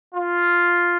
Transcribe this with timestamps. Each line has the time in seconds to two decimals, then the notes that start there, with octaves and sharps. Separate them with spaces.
0.15 F4